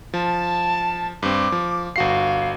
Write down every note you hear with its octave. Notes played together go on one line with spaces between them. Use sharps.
F3 A5
G2 C4 D6
F3
G1 F#4 F5 C7